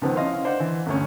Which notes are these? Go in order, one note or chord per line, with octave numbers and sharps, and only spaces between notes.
C#2 D#3 F3 B3
C#4 E4 D#5 F5 C6
D4 C5 F#5
E3
G1 D2 C#4